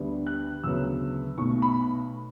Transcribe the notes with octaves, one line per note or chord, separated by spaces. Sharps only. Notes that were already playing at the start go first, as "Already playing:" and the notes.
Already playing: D2 D3 G3 B3
F#6
D2 C#3 F#3 B3 E6
B1 B2 A3 C#6
B5